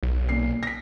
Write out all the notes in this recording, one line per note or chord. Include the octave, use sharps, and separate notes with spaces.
B1
A#2 C7
A#6 B6